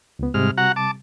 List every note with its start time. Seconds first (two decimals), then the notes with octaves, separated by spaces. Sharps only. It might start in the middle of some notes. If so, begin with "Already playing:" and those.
0.19 C#2 B3
0.34 G#2 C3 G3 F6
0.57 F#4 F#5 A#5
0.76 A5 D6